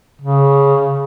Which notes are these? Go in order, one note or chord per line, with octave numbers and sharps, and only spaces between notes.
C#3